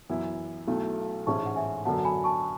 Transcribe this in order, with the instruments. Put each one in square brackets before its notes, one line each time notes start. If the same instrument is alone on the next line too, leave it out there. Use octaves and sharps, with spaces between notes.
[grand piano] F#2 E3 B3 E4
B1 B2 F#3 A3 E4
[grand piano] A1 G#2 G#3 C#4 [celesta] A5 C#6
[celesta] F#5
E5 G#5
[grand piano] F#2 D3 F#3 B3 [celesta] F#5 A5
[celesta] G#5 B5
A5 C#6